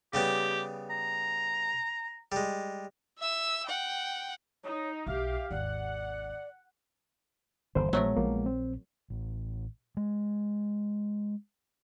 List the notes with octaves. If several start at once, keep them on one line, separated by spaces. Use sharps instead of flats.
C#3 G3 B3 G4
A#5
G3 G#3
E5 E6
F#5 G5
D#4 C#5
B1 G4 E5 F5
G#1 D#2 D5 F#5
G1 E2 D3 C5
A#1 F#3 G#3 A3 B3 A#4
A#1 F3 A#3
C4
A1
G#3